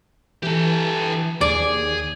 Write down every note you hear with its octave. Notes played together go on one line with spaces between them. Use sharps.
E3 G4 A4
D#2 G#4 D5